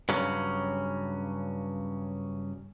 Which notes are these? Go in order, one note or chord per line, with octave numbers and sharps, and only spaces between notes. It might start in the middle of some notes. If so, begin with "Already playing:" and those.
G2 C#3 F#3 C#4